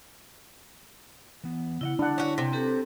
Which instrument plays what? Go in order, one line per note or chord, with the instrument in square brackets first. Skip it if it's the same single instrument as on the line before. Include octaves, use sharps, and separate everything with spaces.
[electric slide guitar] E3 B3
[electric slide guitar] C#3 D#5 F#5 [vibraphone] E4
[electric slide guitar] D3 [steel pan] D4 F#5
[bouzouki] C#4 F#4
C3
[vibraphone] C4 G4 A4 [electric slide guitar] B4